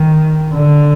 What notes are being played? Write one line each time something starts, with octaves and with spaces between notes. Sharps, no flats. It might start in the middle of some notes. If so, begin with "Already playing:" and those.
Already playing: D#3
D3